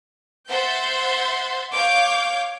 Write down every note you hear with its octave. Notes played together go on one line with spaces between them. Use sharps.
C5 E5 F#5 C6 G6 A6
C#5 F5 D6 G6